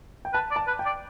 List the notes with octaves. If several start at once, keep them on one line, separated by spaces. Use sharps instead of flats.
G5
B4 A5
D5
A5
B4
G5
D5